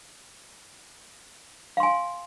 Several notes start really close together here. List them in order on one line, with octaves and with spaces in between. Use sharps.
F5 C6 G#5